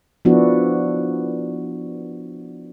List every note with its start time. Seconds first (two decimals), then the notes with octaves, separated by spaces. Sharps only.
0.25 F3 B3 D4 E4 F#4